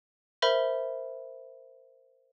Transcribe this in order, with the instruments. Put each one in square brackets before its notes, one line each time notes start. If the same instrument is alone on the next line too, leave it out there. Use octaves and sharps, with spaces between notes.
[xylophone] A#4 C5 E5 B5